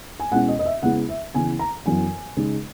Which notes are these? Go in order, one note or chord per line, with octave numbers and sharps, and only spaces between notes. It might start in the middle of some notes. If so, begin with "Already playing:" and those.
G#5
B2 G#3 C#4 E4 F#5
D#5
D#5
E5
C#3 G#3 B3 E4 F#5
E5
C#3 E3 B3 E4 G#5
A#5
F#2 E3 B3 G#5
C#3 G#3 D#4